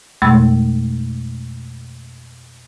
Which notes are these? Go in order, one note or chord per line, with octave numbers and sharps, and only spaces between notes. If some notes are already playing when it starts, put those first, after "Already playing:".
F2 B2 G#3 A3 B5 E6